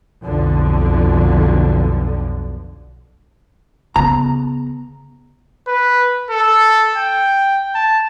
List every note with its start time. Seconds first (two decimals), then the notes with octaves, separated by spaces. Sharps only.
0.23 B1 F2 D3
3.96 C#3 B3 A#5
5.68 B4
6.30 A4
6.97 G5
7.75 A5